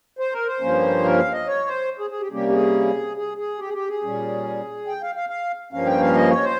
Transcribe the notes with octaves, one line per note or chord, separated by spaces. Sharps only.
C5
A#4
C5
G2 F3 A#3 C#4
A#4
F5
D#5
C#5
C5
G#4
G#4
G4
C3 G3 A#3 C#4 G4
G4
G#4
G#4
G#4
G4
G#4
G4
G#4
A#2 G3 C#4
G5
F5
F5
F5
G2 F3 A#3 C#4 F5
G5
F5
D#5
C#5
C5